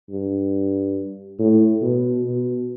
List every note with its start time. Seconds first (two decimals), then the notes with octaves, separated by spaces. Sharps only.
0.10 G2
1.39 A2
1.82 B2
2.24 B2